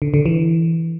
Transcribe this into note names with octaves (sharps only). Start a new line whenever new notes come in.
D3
D3
E3